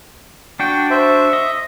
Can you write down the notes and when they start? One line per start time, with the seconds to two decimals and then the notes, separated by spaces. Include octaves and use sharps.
0.60 D4 F#4 G5
0.90 C5 E5
1.33 D#5